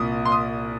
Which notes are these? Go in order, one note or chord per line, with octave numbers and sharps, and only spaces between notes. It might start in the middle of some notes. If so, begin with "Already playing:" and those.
Already playing: C2 A#2 D#6
C6
D#6